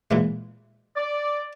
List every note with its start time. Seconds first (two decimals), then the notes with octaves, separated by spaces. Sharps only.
0.11 A#2 E3 G#3
0.97 D5